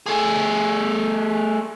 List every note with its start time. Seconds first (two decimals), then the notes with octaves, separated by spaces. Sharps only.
0.06 A3 G#4